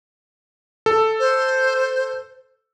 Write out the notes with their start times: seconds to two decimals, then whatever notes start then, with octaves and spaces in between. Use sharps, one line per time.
0.86 A4
1.20 C5